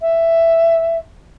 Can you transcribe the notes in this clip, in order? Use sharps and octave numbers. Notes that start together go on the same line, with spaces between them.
E5